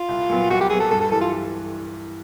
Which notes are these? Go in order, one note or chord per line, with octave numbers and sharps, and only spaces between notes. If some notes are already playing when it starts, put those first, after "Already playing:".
Already playing: F4
C2
A#2 F#3 B3
C2 F#4
G4
A#2 F#3 B3 G#4
A4
G2 A4
A4
E3 G3 A4
F4